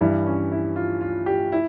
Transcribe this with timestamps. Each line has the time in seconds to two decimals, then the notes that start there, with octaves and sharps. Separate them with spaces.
0.01 G2 E3 G3 E4
0.26 C#4
0.52 E4
0.76 F4
1.01 F4
1.26 G4
1.52 E4